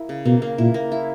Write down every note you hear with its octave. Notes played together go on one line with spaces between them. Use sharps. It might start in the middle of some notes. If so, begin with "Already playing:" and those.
Already playing: A#3 E4
C#3
B2 A#3
A#3
A#2 E4
A#3
E4